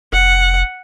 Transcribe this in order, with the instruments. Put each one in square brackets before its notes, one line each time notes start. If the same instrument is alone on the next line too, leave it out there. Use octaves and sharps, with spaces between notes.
[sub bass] F1 [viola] F#5